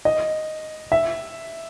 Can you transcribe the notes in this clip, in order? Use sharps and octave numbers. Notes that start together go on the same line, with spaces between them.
D#5
E5